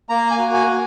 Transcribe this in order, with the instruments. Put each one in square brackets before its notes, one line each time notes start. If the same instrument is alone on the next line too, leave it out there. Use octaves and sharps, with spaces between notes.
[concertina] A#3 A#5
G#5
F#4
G#5
A#3